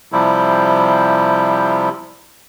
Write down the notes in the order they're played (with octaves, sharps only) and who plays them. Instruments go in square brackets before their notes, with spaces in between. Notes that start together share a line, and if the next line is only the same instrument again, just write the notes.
[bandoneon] C3 F3 G3 E4